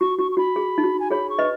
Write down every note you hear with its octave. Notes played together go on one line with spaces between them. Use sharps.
F#4 C#6
F#4 C#6
C#6
F#4 B5
G#4
D#4
F#4
G#5
G#4 C#5 B5
C#6
B4 D#5